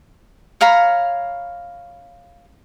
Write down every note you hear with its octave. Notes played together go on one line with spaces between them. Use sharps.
C#5 F5 A#5 B5